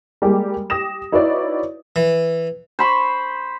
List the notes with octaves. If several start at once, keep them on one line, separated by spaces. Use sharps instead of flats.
G3 G#3 A#3 G4
G4 D#6 A#6 E7
D#4 E4 F#4 B4 C#5 D5
E3
C5 B5 C#6